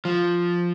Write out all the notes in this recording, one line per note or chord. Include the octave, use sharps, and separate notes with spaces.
F3